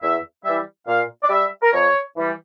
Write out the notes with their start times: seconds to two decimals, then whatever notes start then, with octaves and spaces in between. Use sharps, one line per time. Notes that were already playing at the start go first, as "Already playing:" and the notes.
0.02 E2 E5
0.44 E3 G3 E5
0.87 A#2 F5
1.23 D5
1.29 G3 E5
1.62 A#4
1.72 F2 C#5
2.16 E3 G3